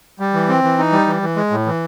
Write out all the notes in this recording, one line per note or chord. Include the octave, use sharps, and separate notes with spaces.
G3
E3
C4
E3
D#4
G3
E3
E3
G#3
A2
E3